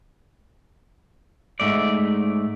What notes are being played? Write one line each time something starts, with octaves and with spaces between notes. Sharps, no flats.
G#2 B2 A3 D5